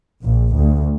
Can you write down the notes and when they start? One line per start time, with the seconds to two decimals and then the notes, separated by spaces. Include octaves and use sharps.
0.25 A#1
0.55 D2